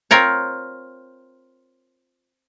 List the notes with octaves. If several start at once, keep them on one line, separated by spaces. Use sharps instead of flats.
C4 F4 A#4 C#5